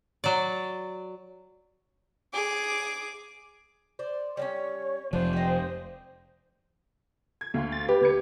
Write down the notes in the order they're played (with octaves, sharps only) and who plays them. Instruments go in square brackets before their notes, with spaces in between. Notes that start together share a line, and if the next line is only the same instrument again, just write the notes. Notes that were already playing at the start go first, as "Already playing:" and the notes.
[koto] F#3 D5
[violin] G#4 D6
[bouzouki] C5 D5
[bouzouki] G3 C4 C#4 [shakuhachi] C#5
[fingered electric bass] F1 F3 [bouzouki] D4 [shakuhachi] C5
[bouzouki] G4 D#5
[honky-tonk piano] G#6
D2 F5 C6
[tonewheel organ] A6
[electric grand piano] G4 [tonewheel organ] B4
[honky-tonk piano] D2 G#6 C#7